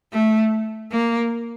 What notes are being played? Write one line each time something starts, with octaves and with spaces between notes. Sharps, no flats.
A3
A#3